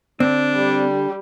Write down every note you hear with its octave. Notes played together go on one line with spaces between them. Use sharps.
D3 C4 D4
G3